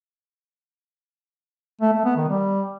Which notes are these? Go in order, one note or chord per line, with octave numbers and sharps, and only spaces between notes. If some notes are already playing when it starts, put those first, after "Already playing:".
A3
A3
B3
D#3
G3